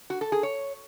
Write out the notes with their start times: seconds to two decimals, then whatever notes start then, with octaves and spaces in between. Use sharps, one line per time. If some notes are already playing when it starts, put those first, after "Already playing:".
0.10 F#4
0.21 A4
0.32 G#4
0.43 C#5